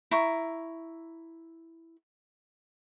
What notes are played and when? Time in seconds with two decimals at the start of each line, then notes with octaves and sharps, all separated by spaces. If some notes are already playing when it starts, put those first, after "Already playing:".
0.11 E4 A#5 C#6